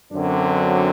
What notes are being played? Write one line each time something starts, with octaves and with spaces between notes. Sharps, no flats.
F#2 D3 F#3 C4 D4